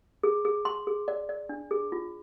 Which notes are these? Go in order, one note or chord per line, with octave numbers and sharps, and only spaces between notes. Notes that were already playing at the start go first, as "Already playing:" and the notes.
G#4
G#4
C6
G#4
D5
D5
D4
G#4
F4